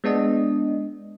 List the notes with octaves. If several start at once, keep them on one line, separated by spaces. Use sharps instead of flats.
G#3 B3 D4 D#5